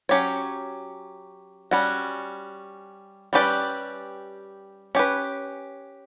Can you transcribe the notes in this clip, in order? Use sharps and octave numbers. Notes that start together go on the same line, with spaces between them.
F#3 C#4 G4 C#5
G3 C#4 F#4
G3 C#4 G4 B4 D5
C#4 G4 B4